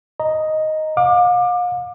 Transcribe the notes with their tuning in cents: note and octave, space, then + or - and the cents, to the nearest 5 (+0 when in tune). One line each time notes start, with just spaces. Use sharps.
D#5 +5 A#5 +0
F5 +40 D6 +25